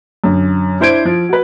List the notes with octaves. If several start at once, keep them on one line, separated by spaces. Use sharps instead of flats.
F#2 D3
D4 E4 C5 G#6 D7
F3
F#4 B4